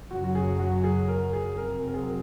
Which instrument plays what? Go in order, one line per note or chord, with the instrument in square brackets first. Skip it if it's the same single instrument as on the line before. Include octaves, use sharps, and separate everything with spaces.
[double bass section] F#2 C#3 F#3 [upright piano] F#4
[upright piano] F#4
G#4
F#4
G#4
A#4
G#4
[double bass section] F1 F2 C3 F#3 C4 [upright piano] A#4
[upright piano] A#4
G#4